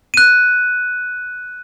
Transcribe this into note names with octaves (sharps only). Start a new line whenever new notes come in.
F#6 D#7